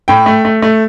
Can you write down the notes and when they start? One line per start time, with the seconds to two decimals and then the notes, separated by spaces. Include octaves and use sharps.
0.08 A2 G5
0.26 A3
0.45 A3
0.62 A3